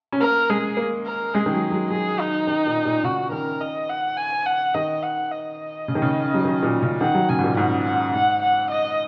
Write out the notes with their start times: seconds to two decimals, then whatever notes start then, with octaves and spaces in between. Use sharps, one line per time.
0.12 C#4
0.20 A#3 A#4
0.50 G#3 G#4
0.77 A#3
1.06 A#4
1.34 G#3 G#4
1.46 D#3
1.54 F#3
1.71 F#3
1.90 F#3 G#4
2.20 D#4
2.47 D#3
2.67 A#2
2.85 A#2
3.04 C#3 F#4
3.32 D#3 A#4
3.61 D#5
3.90 F#5
4.17 G#5
4.46 F#5
4.74 D#3 D#5
5.03 F#5
5.31 D#5
5.88 C#3
5.95 D#3
6.02 C#3
6.34 F#3
6.45 D#3
6.63 A#2
6.82 C#3
7.01 D#3 F#5
7.15 F#3
7.29 C#3 G#5
7.39 G#2
7.44 A#2
7.57 G#2 F#5
7.86 F#5
8.14 G#2 F#5
8.43 F#5
8.71 D#5